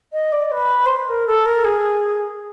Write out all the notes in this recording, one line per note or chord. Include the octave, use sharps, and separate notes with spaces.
D#5
D5
B4
C5
B4
A#4
A4
A#4
G#4